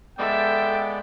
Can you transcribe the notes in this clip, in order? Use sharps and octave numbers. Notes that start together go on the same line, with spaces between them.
G#3 B3 A4 D5 E5 G5